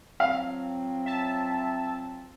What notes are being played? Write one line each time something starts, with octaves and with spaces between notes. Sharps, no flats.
F3 F#3 C4 F5
E5 A5